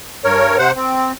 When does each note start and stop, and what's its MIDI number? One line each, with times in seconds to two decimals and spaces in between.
0.24 0.57 43
0.24 0.57 70
0.24 0.57 73
0.58 0.71 48
0.58 0.71 72
0.58 0.71 78
0.76 1.12 60